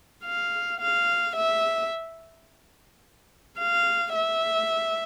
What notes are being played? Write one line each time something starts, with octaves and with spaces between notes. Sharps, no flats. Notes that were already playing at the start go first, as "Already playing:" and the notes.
F5
F5
E5
F5
E5